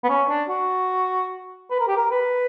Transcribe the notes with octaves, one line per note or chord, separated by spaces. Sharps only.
B3
C#4
D4
F#4
B4
A#4
G4
A#4
B4